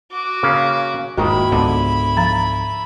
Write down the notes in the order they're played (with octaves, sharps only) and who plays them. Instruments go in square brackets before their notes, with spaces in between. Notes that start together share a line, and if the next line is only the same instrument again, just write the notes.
[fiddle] F#4 D6
[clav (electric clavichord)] C#3 A#3 C#4
[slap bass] D#1 G#2 A#3 [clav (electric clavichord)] D#3 [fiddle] E4 B5 [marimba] F#4
[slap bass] C#2 G#2 B3 [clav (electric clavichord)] D3
[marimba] F3 A#5 A6